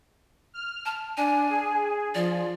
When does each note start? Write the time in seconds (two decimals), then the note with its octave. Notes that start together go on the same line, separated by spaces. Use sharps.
0.54 F6
0.86 A5
1.17 D4 G#5
1.50 G#4
2.15 F3 D5